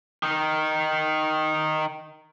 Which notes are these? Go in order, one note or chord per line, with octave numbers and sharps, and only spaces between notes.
D#3 D#4